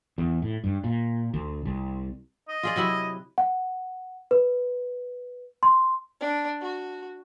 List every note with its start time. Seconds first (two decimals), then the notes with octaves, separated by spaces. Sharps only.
0.18 E2
0.42 A2
0.64 G2
0.84 A#2
1.34 D2
1.65 C2
2.48 D#5
2.63 F4 G#4 D5
2.76 C3 F#3 E4
3.38 F#5
4.31 B4
5.63 C6
6.20 D4
6.61 F#4